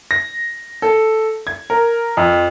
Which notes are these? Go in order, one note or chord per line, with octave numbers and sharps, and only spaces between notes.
A#6
A4
G#6
A#4
F2